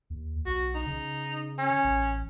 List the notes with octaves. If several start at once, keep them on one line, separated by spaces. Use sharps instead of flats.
D#2
B1 F#4
D#4
C#3
C#4
A1